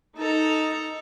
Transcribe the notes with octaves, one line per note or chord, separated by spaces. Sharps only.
D#4 A4 A#5